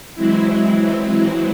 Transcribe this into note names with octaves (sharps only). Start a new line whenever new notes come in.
E3 F#3 G#3 C4 E4